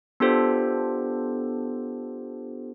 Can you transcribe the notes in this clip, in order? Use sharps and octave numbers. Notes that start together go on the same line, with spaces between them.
B3 D4 F4 G4 A4 C5